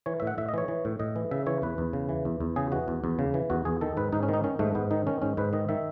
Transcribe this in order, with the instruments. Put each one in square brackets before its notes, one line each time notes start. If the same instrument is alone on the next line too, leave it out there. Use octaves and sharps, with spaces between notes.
[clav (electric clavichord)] E3 C#5
A2 E5
F#5
A2 E5
D#5
E3 C#5
E3
A2
A2 D#5
E3
C#3 E5
E3 C#5
E2 B4
E2
C#3
E3
E2
E2
C#3 G#4
E3 F#4
E2
E2
C#3
E3
E2 F#4
E2 G#4
D#3 A4
G#2 B4
G#2 D#4
C#4
D#3
D#4
D#3 C#4
G#2 A3
G#2 B3
D#3 D#4
D#3 C#4
G#2 C#4
G#2 B4
D#3 D#5
D#3 E5